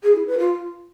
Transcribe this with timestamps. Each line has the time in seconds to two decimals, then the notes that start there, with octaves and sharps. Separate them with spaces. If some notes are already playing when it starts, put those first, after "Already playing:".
0.03 G#4
0.15 E4
0.27 B4
0.38 F4